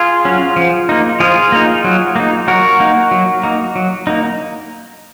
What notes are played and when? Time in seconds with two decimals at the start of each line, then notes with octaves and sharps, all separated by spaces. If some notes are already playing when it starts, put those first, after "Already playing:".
Already playing: F4 G#4
0.25 F#3 C#4
0.56 F3
0.89 A#3 D#4
1.20 F3 F4 G#4
1.52 A#3 D#4
1.84 F#3
2.16 A#3 D#4
2.48 F#3 F#4 A#4
2.80 A#3 D#4
3.11 F#3
3.43 A#3 D#4
3.76 F#3
4.07 A#3 D#4